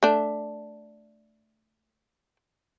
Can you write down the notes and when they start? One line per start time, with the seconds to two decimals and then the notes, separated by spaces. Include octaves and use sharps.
0.03 A3 D4